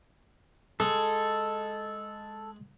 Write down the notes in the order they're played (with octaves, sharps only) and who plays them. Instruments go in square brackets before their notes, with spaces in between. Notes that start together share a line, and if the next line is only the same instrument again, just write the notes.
[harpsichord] G#3 [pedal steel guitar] A4